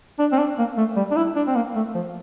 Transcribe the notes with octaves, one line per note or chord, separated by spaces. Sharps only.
D4
C4
D4
A#3
A3
G3
D4
E4
D4
C4
A#3
A3
F3